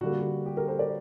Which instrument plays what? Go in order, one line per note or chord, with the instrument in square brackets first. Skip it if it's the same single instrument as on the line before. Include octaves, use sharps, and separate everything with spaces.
[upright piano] D3 G3 A#3 F#4
F#4
G4
G4 A#4
A4 C5
A#4 D5